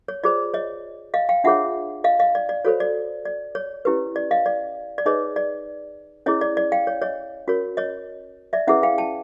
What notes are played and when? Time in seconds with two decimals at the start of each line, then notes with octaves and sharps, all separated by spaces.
0.08 C#5
0.24 F4 G#4 C5 D5
0.54 C#5 D#5
1.14 D#5 F5
1.29 F5 G5
1.44 D4 F4 G#4 C#5 E5 F#5
2.04 D#5 F5
2.20 D#5 F5
2.35 D5
2.49 D5
2.65 F#4 A4 C5 C#5
2.80 D5
3.25 D5
3.55 C#5
3.85 C#4 E4 G4 B4
4.16 D5
4.31 D#5 F5
4.46 D5
4.98 D5
5.06 D#4 G#4 B4 C#5 D#5
5.36 D5
6.26 C#4 E4 G#4 C#5 D#5
6.41 D5
6.57 D5
6.72 F5 G5
6.87 C#5
7.02 C#5 D#5
7.47 C#4 F#4 A#4 C#5
7.77 C#5 D#5
8.53 D5 E5
8.67 C#4 E4 G#4 B4 E5 F#5
8.83 F5 G5
8.98 G5 A5